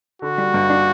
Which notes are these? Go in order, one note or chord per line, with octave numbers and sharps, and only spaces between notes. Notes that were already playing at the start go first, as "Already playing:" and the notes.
D3 F#4
G3
G2
D4